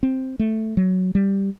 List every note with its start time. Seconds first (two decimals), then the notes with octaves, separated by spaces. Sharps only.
0.03 C4
0.39 A3
0.77 F#3
1.15 G3